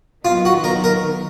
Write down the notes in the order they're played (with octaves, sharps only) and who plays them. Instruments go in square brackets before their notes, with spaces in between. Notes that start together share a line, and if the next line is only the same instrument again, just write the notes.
[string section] D#3 F#3 B3 D#4 [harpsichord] F4
[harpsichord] F#4
A#4
A#4